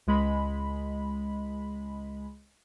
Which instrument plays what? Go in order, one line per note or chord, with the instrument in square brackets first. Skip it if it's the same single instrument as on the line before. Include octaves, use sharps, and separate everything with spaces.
[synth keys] C#2 G#3 B5